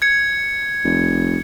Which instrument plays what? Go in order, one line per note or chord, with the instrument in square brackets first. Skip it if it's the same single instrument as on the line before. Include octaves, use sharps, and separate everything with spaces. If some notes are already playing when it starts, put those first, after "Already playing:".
[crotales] G#6 C#7
[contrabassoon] F1